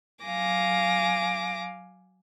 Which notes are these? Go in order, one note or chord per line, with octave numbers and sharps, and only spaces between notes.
F#3 F5 G#5 D6 A#6